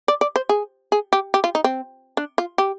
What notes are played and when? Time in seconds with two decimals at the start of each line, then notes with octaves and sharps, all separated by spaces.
0.08 D5
0.21 D5
0.36 C5
0.49 G#4
0.92 G#4
1.13 G4
1.34 G4
1.44 F4
1.55 D#4
1.64 C4
2.17 D4
2.38 F4
2.58 G4